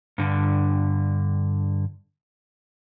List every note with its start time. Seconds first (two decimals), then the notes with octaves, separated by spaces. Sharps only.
0.18 G2 D3